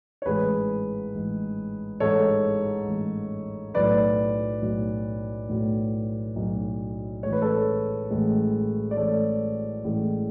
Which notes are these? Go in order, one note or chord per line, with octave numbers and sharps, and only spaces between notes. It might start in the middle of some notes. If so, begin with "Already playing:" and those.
C#5
A1 G#2 G#3 G#4 B4
A1 G#2 G#3
A1 G#2 G#3 A4 C#5
A1 G#2 G#3
B1 A2 F#3 B4 D5
B1 A2 F#3
B1 A2 F#3
B1 A2 F#3
A1 A2 G#3 C#5
B4
A4 C#5
A1 A2 G#3
D5
A1 A2 G#3 A4 C#5
A1 A2 G#3